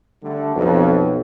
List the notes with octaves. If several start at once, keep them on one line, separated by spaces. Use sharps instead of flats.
D3 G3 A3
B1 F2